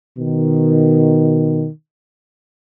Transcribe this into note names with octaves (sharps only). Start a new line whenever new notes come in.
B2 D#3